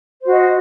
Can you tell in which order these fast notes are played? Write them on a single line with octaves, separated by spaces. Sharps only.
C5 F#4 D#5